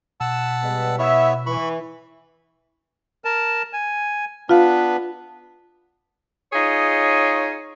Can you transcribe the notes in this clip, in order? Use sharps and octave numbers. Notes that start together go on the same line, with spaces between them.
B2 F#5 A5 E6
G3 G#3 B3
B3 E4 C#5 E5
E3 B5 C#6
A#4 A5
G#5
B3 D4 F4 B4 F5
D#4 F4 G#4 C#5